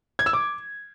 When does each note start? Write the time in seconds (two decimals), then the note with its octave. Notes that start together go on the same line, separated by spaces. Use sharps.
0.19 G#6
0.26 E6
0.33 D6